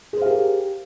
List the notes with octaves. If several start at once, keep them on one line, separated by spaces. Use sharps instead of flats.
G4 G#4 A#4 C5 F5